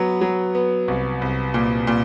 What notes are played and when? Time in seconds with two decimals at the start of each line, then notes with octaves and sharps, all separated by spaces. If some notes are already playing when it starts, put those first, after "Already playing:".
Already playing: F#3 B3
0.21 F#3
0.55 B3
0.88 C2
1.22 C2
1.54 A#2
1.87 A#2